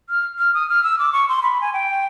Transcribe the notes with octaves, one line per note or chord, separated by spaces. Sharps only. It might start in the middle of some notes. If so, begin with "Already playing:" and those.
F6
F6
D#6
F6
E6
D6
C#6
C6
B5
G#5
G5